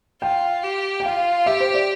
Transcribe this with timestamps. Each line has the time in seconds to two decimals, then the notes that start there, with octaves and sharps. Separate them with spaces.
0.22 F4 G5
0.64 G4
1.00 G5
1.06 F4 F5
1.46 G4 E5
1.60 C5
1.74 D5